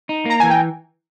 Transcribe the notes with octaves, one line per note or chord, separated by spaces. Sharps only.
D#4
A#3 A#5
E3 G#5
G5